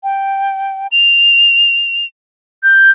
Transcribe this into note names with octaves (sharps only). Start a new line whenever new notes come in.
G5
F7
G6